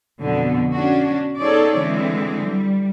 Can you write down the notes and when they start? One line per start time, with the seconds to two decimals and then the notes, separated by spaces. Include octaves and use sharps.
0.20 F2 B2 D3
0.73 C#4 D4 F#4
1.40 B3 D#4 G#4 A4 C#5 D5
1.78 D3 E3 G#3 C4
2.46 G3